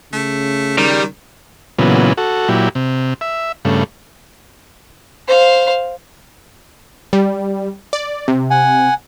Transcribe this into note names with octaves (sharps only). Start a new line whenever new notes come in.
C#3 A3
D#3 G3
A#2 C#3 E3 F#3 B3
F#4 A4
A#2 F#3 E4 G4
C3
E5
G2 C#3 A3
C5 F5
G3
D5
C3
F#5 G#5